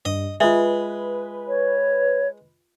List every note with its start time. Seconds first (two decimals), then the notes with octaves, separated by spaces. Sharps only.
0.05 G2 D#5
0.41 G#3 F4 B4 E5
1.48 C#5